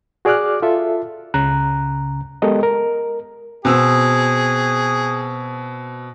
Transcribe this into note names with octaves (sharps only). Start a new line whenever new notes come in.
F#4 G#4 D5 D6 F6 F#6
F4 A4 E5
C#2 C#3 A#5 F#6
G#3 B3 G4 A4 A#4 D#5
A#4
B2 C4 G#4 E6